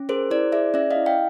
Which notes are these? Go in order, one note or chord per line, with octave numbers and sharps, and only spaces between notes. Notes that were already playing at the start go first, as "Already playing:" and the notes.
Already playing: C#4
G#4 A#4 C5
E4 C5 D5
G#4 D5 E5
C#4 D5 E5
D#5 F5
E4
F5 G5